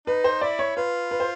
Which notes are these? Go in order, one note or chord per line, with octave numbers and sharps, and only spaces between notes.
D#4 B4
C5
E4 D5
C#5
F4 B4
B4
C5